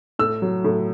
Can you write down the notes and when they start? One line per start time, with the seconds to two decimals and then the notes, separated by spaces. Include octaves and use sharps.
0.19 A2 E6
0.42 F#3
0.64 A2